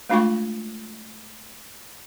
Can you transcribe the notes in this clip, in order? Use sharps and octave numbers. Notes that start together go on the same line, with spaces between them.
G#3 A3 D4 F4 G5 C#6